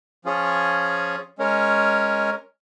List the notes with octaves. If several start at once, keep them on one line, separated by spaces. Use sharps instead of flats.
F3 C#4 F4 G#4 C#5
G#3 C#4 A#4 C#5